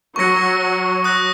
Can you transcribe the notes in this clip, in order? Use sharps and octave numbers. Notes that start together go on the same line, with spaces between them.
F#3 C#6 A#6 C#7
D#6 F#6 A#6